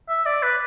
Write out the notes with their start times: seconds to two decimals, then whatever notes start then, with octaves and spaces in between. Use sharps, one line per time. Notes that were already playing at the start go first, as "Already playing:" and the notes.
0.09 E5
0.26 D5
0.43 B4